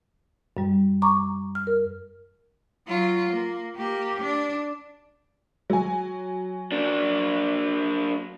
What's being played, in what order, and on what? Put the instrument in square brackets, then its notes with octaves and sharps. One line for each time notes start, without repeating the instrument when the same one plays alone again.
[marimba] F#2 G3
A#5 C#6 D6
F6
A#4
[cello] F#3 F4
A#3
A#3 G4
D4
[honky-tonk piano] F#3 G#5
[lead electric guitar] A#3 D4